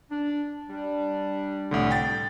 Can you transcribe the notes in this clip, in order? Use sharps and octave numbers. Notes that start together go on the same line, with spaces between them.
D4
G3 D4
C2 A2 D3
G5 A6